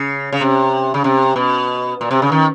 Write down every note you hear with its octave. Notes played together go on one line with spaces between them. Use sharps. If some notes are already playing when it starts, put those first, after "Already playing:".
Already playing: C#3
C#3
C3
C#3
C3
B2
A#2
C3
C#3
D#3